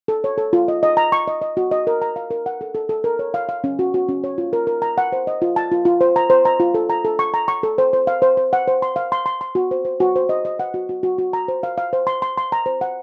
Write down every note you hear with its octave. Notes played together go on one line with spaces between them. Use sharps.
A4
C#5
A4
F4
D#5
D#5
A#5
C#6
D#5
D#5
F#4
D#5
A#4
A#5
F5
A#4
F#5
A4
A4
A4
A#4
C#5
F5
F5
C#4
F#4
F#4
C#4
C#5
F4
A#4
A#4
A#5
F#5
C5
D#5
F4
A5
F4
F4
C5
A#5
C5
A#5
F4
A4
A#5
A4
C#6
A#5
C#6
A4
C5
C5
F5
C5
C5
F#5
C5
C6
F5
C6
C6
C6
F#4
C5
C5
F#4
C5
D#5
D#5
F#5
F#4
F#4
F#4
F#4
A#5
C5
F5
F5
C5
C6
C6
C6
A#5
C5
F#5